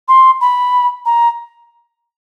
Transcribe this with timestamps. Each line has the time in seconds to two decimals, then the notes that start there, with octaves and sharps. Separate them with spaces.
0.08 C6
0.41 B5
1.06 A#5